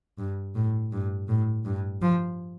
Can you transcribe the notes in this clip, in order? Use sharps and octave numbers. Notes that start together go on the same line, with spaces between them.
G2
A2
G2
A2
G2
F3